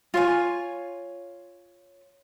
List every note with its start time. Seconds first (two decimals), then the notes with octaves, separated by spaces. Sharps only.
0.14 F4 C#5 G#5